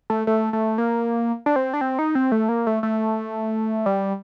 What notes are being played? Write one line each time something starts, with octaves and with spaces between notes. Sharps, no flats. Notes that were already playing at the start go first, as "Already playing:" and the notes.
A3
A3
A3
A#3
D4
C4
D4
C4
D#4
C4
A3
A#3
A3
A3
G3